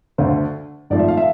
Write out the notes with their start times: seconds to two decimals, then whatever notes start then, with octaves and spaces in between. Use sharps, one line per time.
0.18 D2 D3 A3 C5
0.90 G#1 G#2 F3 A3 D5
0.99 E5
1.08 F5
1.17 E5